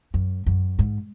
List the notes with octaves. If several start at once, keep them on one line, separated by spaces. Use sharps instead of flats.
F#2
F#2
G#2